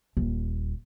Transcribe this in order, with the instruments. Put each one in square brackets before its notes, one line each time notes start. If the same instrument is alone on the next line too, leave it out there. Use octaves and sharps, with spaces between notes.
[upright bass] D#1